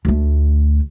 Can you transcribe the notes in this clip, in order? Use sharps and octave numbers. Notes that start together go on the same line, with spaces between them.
D2 A3